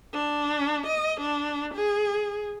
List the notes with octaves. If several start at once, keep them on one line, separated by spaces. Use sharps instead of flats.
D4
D#5
D4
G#4